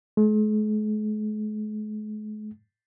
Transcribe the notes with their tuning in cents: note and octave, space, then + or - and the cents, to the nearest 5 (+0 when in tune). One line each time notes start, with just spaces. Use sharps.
G#3 +45